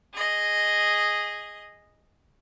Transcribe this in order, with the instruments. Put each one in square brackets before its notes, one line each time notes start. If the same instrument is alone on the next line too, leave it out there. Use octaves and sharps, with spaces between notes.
[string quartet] G#4 D#5